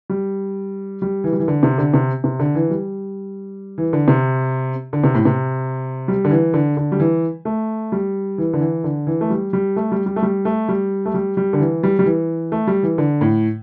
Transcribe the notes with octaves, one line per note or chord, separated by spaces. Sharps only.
G3
G3
E3
G3
E3
D3
C3
D3
C3
C3
D3
E3
G3
E3
D3
C3
D3
C3
A2
C3
G3
D3
E3
D3
D3
G3
E3
A3
G3
E3
D3
E3
D3
E3
A3
G3
G3
A3
G3
G3
A3
G3
A3
G3
A3
G3
G3
D3
E3
G3
G3
E3
A3
G3
E3
D3
A2